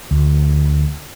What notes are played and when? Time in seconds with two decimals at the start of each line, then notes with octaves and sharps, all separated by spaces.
0.11 D2